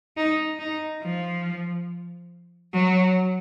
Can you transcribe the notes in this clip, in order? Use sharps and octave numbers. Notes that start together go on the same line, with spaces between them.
D#4
D#4
F3
F#3